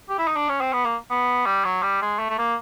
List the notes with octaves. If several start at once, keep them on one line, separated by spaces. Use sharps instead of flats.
G4
E4
D#4
D4
C#4
C4
B3
A#3
B3
G3
F#3
G3
G#3
A3
A3
A#3